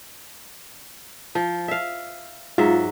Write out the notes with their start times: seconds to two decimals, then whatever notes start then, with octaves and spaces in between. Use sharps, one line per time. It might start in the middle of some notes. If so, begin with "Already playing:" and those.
1.35 F3
1.68 E5 F5
2.58 G#2 F#3 F4 E5